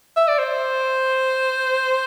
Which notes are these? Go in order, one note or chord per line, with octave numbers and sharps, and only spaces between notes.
E5
D5
C5